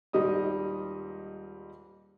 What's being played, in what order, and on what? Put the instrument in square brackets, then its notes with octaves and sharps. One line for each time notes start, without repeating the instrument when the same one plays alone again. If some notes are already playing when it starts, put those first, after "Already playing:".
[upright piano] D#1 G#2 G3 D#5 D#6